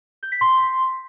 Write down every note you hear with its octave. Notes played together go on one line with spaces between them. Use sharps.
G6
B6
C6